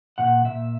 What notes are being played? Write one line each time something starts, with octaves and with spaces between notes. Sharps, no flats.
A#2 F#5
A#2 E5